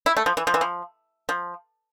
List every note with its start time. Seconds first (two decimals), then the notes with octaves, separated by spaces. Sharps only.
0.06 E4
0.17 A3
0.26 F3
0.37 E3
0.47 F3
0.54 E3
0.61 F3
1.29 F3